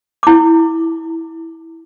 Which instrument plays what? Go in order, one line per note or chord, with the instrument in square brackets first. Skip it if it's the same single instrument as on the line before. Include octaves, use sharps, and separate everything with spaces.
[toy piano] E4 D6